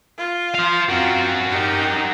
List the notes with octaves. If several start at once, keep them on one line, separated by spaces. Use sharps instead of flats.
F4
C5 F5
C4 F4 F#4 A#4
D#4 G4